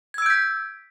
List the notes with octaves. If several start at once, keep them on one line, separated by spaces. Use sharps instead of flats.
E6 G6 G#6 B6 D7